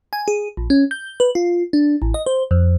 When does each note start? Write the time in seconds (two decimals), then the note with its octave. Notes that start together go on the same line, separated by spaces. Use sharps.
0.13 G#5
0.28 G#4
0.57 A#1
0.70 C#4
0.91 G6
1.20 B4
1.35 F4
1.73 D4
2.02 A1
2.14 D#5
2.26 C5
2.51 F2